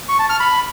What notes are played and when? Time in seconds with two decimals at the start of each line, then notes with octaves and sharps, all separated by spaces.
0.09 C#6
0.19 A5
0.30 F6
0.40 B5